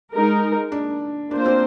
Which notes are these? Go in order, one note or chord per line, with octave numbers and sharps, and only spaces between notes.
G#3 D#4 A#4
D4
A#3 D4 F4 C5
C4